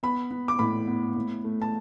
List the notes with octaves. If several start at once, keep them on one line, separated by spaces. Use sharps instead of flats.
B3 B5
B3
D6
A2 B5
B3
A2
A3
A5